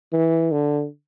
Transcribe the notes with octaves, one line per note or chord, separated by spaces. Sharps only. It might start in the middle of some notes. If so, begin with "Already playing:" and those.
E3
D3